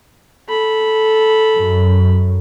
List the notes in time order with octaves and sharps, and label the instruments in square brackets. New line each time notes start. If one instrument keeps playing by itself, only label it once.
[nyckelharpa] A4 B5
[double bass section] F#2